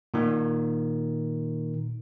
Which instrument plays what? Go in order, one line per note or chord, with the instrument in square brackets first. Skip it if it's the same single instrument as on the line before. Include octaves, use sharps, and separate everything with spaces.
[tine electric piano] A#2 D#3